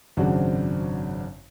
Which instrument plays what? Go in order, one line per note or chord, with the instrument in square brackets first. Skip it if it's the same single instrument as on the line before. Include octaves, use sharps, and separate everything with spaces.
[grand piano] G#1 F#2 C#3 C4 D4 F#4